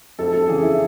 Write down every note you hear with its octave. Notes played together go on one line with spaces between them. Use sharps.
F2 A4
A4
C#3 E3 G#4
E4